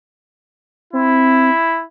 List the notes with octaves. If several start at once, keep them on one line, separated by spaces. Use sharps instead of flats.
C4 E4